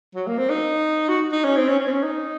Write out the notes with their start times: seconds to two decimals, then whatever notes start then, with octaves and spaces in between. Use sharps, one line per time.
0.15 F#3
0.27 A#3
0.38 C4
0.50 D#4
1.08 F#4
1.32 D#4
1.44 C#4
1.57 C4
1.68 C#4
1.80 C#4
1.87 C4
1.91 C#4
2.03 D#4